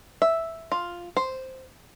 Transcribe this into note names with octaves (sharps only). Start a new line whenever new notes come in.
E5
F4
C5